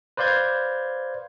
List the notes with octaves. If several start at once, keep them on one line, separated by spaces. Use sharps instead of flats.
B4 C5 D5 F5 G6 G#6